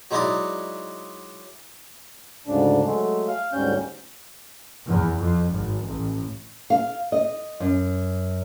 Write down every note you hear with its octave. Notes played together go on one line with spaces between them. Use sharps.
F#3 G#3 D#4 E4 D5 D#5
D2 G#2 C#3 D4
F#3 G#3 A3
F5
D2 G#2 G3 C#4 G6
E2
F2
G#1
A1
F5
D#5
F#2